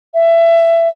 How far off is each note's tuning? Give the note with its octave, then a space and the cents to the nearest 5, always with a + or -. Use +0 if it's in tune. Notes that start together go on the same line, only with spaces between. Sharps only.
E5 +20